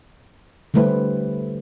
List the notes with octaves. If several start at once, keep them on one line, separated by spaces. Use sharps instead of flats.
D3 G3 A3 E4 B4 C5